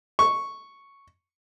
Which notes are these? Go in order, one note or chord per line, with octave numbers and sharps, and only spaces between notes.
C#6